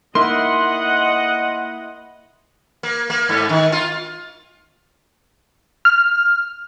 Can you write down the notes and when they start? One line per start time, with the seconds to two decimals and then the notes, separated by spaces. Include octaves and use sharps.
0.15 A#3 D#4 E4 D#5 F#5 C6
2.83 A#3
3.10 A#3
3.29 G#2
3.49 D#3
3.72 F4
5.85 F6